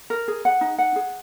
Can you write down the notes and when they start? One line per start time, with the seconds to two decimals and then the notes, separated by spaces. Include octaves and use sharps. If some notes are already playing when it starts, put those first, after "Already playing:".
0.10 A#4
0.28 G#4
0.45 F#5
0.61 D#4
0.78 F#5
0.96 G#4